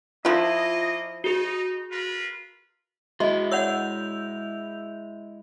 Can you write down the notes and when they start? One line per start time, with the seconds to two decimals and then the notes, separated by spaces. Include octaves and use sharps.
0.25 F3 A#3 E4 F4 D#5
1.24 D#4 F#4 G#4
1.91 F4 A#4 B4
3.20 G#3 E4 F#4 D#5 E5
3.51 C#5 D5 F#5 E6 G6 F7